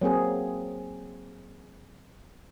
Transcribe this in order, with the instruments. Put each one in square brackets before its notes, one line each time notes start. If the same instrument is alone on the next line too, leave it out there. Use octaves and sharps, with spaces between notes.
[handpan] F#3 A#3 C4 G#4